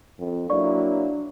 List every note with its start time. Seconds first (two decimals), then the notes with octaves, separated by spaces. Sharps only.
0.18 F2
0.50 F#3 A#3 D4 E4 D5 C#6